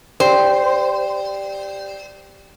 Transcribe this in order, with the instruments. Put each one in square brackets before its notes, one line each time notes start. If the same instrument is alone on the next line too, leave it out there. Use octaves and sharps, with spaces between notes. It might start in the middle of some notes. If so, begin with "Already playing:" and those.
[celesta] G4 D5 G5 [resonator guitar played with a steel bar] C5